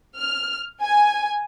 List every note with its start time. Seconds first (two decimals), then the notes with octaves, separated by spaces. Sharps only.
0.18 F6
0.81 G#5